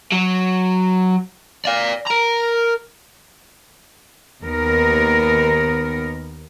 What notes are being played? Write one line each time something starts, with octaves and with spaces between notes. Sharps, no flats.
F#3
D5 F5
A#4 A#5
D#2 B3 A#4